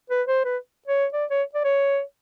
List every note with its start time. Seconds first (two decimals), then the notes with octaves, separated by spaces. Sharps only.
0.10 B4
0.28 C5
0.45 B4
0.88 C#5
1.13 D5
1.30 C#5
1.54 D5
1.64 C#5